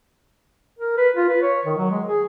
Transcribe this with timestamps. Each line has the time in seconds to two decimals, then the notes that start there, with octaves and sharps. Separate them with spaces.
0.79 A#4
0.97 B4
1.16 F4
1.29 B4
1.42 C#5
1.65 D#3
1.78 F#3
1.91 G#3
2.07 G#4